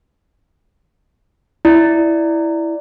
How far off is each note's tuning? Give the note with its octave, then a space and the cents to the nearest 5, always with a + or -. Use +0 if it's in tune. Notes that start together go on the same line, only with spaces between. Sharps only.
E4 +0 D5 +0